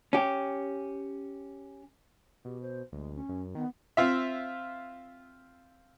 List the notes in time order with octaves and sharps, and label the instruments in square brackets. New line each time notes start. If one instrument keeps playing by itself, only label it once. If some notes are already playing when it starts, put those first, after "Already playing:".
[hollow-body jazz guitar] C#4 G4
[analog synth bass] B2 [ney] G4
[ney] C5
[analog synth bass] D2 [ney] G#3
[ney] C#4
[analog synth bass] F#2
[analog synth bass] D#3 [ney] B3
[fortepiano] C4 F4 E5